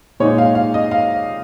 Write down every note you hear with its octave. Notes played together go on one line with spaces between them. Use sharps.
A#2 G#3 D#4 C#5
F5
F5
D#5
F5